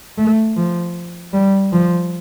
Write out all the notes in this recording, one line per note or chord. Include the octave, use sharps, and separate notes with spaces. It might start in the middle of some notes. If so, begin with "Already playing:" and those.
A3
F3
G3
F3